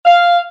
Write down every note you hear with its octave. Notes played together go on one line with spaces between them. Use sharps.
F5